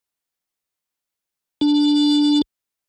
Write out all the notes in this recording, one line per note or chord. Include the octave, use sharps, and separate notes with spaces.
D4